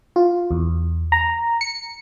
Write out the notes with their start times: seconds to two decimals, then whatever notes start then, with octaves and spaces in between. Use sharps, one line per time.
0.16 F4
0.51 E2
1.12 A#5
1.61 C#7